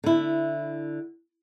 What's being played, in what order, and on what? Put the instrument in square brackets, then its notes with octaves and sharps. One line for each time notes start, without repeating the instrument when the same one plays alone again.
[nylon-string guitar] D3 E4